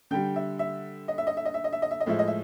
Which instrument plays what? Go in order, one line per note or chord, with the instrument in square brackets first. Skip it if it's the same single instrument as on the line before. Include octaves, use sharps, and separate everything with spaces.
[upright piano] D3 G3 G5
E5
E5
D#5
E5
D#5
E5
D#5
E5
D#5
E5
D#5
E5
D#5
A2 F3 G#3 E5
D#5
E5